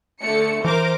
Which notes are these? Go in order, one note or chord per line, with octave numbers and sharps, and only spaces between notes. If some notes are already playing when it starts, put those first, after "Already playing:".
D3 A3 C#7
E3 A#4 C5 D6